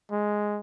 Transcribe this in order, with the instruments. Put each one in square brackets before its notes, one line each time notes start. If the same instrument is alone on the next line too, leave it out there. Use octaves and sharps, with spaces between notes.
[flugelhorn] G#3